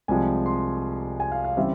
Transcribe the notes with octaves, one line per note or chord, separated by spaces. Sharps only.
C2 C3 F3 G#3 G#5
C6
G#5
F5
F5
C#3 E3 G3 C4 E5